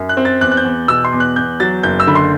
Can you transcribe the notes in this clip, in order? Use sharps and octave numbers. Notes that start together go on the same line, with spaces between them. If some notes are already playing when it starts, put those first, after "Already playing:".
Already playing: F#2
F#6
C4
A6
E2 F#6
F#6
G6
E2
B2 E6
C6
E2
F#6
E2 G6
F#3 A6
F#1 G6
E6
D3 B5
C6